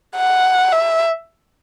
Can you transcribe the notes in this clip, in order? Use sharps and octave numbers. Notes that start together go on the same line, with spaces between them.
F#5
E5